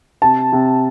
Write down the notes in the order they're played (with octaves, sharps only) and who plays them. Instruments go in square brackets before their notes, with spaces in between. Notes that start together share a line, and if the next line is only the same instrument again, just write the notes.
[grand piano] C3 [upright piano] A5
[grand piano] C3